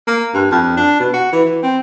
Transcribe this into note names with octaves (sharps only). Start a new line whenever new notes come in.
A#3
G2
F2
D4
B2
F#4
E3
E3
C4